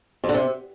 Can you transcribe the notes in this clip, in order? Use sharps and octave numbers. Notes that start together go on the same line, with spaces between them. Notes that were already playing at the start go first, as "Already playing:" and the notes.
F2
D3
C3